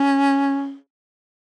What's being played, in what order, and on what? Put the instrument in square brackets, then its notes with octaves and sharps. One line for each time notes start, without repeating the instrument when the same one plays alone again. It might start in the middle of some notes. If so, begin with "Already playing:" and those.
Already playing: [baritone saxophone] C#4